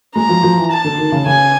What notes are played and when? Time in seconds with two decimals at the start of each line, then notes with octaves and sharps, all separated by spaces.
0.15 G#3 A#5
0.29 F3
0.43 F3
0.57 E3
0.71 A5
0.84 D3
0.98 D#3
1.12 C#3
1.26 C#3 G#5